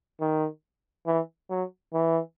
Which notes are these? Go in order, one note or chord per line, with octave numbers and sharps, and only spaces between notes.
D#3
E3
F#3
E3